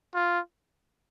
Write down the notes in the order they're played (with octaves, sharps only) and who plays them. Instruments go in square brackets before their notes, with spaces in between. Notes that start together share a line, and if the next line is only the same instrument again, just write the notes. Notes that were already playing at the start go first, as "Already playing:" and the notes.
[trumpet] F4